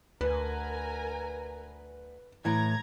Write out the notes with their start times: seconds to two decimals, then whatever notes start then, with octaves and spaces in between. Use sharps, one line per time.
0.21 D2 A#4 B4 G#5 A#5
2.45 A2 E3 A#5 G#6